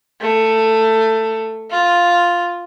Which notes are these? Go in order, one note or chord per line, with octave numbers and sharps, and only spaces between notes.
A3
F4